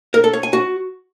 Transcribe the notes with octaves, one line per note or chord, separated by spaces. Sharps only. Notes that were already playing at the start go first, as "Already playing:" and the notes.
A#4
A4
C#5
G#5
F#4